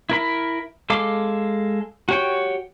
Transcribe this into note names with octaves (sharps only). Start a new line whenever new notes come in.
E4 A#4 B5
G#3 A4 F5 D6
F#4 G4 C#5 G5